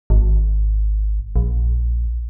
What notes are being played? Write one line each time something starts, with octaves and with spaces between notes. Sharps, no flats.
G#1
A#1